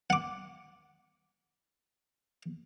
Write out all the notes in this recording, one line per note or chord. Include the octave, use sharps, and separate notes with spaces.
F#5 D6